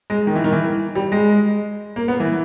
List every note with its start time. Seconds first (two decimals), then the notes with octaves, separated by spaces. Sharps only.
0.10 G#3
0.27 D#3
0.36 E3
0.44 D#3
0.52 E3
0.95 G3
1.12 G#3
1.96 A#3
2.08 B3
2.20 E3